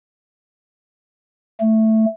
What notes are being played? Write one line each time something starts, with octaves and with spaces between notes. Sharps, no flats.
A3